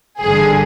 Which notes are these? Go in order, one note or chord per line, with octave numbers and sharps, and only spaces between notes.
G1 G2 D3 G#4